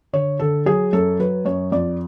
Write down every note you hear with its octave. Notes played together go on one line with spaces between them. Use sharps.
D3 C#5
D3 A4
F#3 G#4
F#2 A4
F#3 B4
F#2 C#5
F2 D5